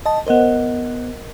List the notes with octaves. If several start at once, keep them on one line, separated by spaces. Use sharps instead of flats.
D#5 A5
B3 A#4 C5 D#5 F#5